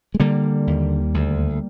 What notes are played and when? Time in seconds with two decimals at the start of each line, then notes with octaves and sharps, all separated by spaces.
0.14 G#3
0.20 D3 G3 A#3
0.67 D#2
1.14 D2